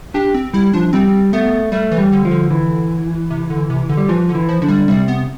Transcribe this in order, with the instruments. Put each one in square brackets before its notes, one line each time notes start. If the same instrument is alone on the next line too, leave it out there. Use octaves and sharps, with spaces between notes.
[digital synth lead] D4 [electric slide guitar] G4
[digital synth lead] C4
[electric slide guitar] G3 [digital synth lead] E4
[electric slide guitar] F3 [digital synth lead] D4
[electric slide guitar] G3 [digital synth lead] C4
[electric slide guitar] A3 [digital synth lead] B3
[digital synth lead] G3 [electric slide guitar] A3
[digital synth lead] E3
[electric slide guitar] G3
[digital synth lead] D3
[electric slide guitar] F3
[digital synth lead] D3
[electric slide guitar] E3
[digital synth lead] C3
D3
C3
D3
[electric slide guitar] G3
[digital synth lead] E3 [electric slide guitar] F3
[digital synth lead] D3
[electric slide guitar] E3
[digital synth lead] F3
[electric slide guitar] D3 [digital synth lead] F3
[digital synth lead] G3
[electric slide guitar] C3 [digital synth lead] G3
[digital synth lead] B3